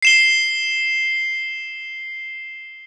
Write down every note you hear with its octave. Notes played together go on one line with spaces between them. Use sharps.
C7 E7 G7